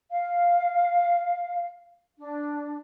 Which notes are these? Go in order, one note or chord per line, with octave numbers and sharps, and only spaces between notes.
F5
D4